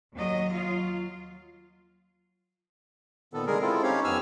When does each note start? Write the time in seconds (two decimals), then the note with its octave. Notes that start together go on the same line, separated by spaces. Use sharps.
0.13 D#2 F#3 D#5
0.51 F#3 F4
3.33 A#2 D#3 B3 A4
3.47 D3 G3 G#3 G#4 A#4
3.61 G#3 C4 E4 F4 A4
3.83 C4 C#4 D#4 G4 C#5 F5
4.04 F2 B3 G#5 E6 F6